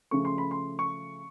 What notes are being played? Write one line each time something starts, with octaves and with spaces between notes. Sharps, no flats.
C#3 F3 A3 C#6
C6
B5
C6
C#6